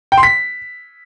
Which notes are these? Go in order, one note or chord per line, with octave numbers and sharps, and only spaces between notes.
G5
C6
B6